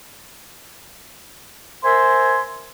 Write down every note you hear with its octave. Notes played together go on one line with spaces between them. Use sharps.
A#4 C5 E5 G#5 C6